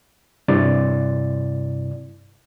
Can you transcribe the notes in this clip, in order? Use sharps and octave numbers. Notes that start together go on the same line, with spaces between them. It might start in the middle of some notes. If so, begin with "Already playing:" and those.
G2 C3 E4 D5 A6